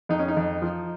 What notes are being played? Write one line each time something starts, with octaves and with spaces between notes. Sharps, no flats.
F2 D#4
C#4
D#4
F2
F3